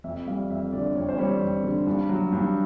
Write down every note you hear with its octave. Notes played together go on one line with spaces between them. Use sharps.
F2 E5
G3 F5
F2 E5
D3 D5
F2 C#5
C5
G3 C#5
F2
D3
G2
F#3
G2